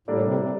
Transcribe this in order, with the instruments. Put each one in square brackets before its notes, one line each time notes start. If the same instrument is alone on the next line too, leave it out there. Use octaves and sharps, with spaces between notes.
[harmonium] A2 [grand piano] G3 A#3 D4 A4 D5
[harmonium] C3
C3